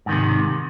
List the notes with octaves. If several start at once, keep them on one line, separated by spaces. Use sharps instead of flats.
G#2 C3 D#3